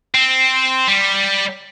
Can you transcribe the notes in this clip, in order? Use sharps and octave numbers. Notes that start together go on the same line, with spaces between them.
C4
G3